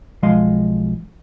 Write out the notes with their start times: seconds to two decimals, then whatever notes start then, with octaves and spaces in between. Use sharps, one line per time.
0.23 B1 F3 G#3 D#5 F5 C6